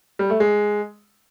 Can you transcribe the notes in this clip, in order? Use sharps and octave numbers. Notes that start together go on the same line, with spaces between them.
G3
A3
G#3